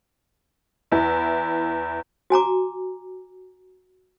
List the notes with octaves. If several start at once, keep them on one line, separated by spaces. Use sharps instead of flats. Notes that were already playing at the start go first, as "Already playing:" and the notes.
E2 E4
F#4 G#5 A#5 D6